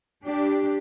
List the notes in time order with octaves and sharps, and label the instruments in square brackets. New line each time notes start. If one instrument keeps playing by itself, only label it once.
[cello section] D4 G4